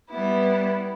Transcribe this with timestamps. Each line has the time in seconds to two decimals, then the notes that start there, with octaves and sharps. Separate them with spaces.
0.10 G3 B3 E4